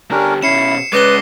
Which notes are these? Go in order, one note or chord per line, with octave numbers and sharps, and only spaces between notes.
D3 C#4 D4 G4 A#4
B2 C#4 E4 C7 C#7 E7
G#3 C#4 B4 D5 D6 D#6 A#6 G7